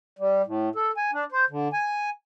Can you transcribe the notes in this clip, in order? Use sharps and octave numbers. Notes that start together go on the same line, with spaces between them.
G3
A2
A4
G#5
D4
C5
D3
G#5